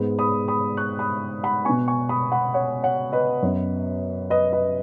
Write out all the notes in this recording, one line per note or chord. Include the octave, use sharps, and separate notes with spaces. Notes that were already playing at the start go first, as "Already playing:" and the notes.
Already playing: G#2 G#3 B3
B5 D#6
B5 D#6
C#6 F#6
B5 D#6
F#5 B5
B2 B3 G#5 C#6
G#5 C#6
B5 D#6
F#5 B5
C#5 F#5
C#5 F#5
B4 D#5
F#2 F#3 B3
B4 D#5
B4 D#5